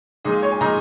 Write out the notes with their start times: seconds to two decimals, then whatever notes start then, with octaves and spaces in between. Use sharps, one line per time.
0.25 A#2 G#3 D#4 D#5
0.33 F5
0.43 C#5
0.52 G#5
0.61 A#2 G#3 D#4 A#5